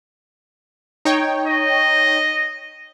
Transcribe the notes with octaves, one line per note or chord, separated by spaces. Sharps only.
D#4 C#5 G5
D#5